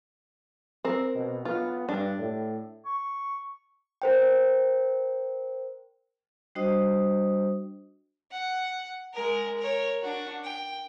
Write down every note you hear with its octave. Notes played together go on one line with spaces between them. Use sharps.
C4 A#4
B2
B3 F4
G2 D4
A2
C#6
A#4 C5 G5
G3 D4 F#4 C5 D#5 D#6
F#5
G#3 A#4
A#4 C#5
D4 F#4
G5